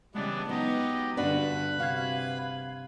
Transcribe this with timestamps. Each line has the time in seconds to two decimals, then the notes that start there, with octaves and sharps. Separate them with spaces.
0.15 C#3 E3 G3 G#3 B3 D4
0.49 F#3 B3 D#4 G4 D#5
1.17 G2 D3 B3 D4 F#4 B4 B5 F#6
1.80 C3 F#4 F5 G#6